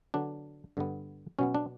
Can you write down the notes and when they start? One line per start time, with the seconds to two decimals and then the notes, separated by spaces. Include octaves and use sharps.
0.14 D3 F#3 B3 D4
0.77 G2 D3 G3 B3
1.39 B2 F#3 B3 C#4
1.55 D4